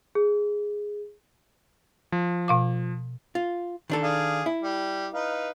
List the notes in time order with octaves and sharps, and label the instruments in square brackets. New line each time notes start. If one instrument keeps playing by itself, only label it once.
[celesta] G#4
[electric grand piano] F3
[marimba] B2 F5 D6
[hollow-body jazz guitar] F4
D#3 D4 A4
[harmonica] G#4 D5 F5
[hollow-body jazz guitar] E4
[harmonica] G3
D#4 B4 F5